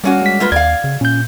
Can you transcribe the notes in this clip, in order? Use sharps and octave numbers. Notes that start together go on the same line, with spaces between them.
G3 A#3 C#4 F#4
G#3 B6
A#3 F4 B4
D#2 D5 F5 G#6
C#3
A#2 C#4 G6